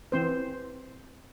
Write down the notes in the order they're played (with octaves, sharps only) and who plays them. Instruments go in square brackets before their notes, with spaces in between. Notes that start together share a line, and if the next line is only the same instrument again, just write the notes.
[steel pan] E3 C4 C5